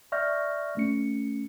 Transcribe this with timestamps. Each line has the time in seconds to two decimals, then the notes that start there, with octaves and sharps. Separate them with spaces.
0.12 D5 E5 C#6 F6 G6 A#6
0.77 A3 C#4 C#7